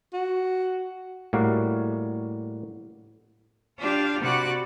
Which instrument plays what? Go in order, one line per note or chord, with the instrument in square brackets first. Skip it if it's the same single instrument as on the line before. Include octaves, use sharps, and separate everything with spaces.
[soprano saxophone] F#4
[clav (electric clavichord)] A2 G3 A#3 F#4 F5
[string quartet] D4 F4 G4 F5
C3 F#4 D5 B5 F#6